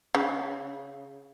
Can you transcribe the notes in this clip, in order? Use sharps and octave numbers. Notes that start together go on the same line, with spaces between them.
C#3